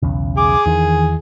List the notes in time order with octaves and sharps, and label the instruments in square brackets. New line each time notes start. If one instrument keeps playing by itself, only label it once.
[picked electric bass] B1 E2 C#3
[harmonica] G#4 [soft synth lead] D6
[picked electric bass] E2 E3 [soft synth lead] D#3